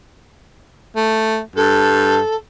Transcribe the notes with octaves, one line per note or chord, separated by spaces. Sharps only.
A3
G2 A4